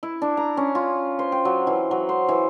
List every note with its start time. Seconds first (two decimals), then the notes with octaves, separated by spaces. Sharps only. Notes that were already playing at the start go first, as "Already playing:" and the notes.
0.03 E4
0.22 D4
0.37 A#5
0.57 C#4
0.75 F4
1.19 C5
1.32 G5
1.45 F#3
1.67 E3
1.91 F#3
2.09 C5
2.29 E3